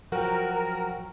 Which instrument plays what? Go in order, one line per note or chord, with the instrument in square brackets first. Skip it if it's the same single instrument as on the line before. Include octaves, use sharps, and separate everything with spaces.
[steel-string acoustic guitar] F3 F#3 F#4 [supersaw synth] A#4 [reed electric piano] F#5 G5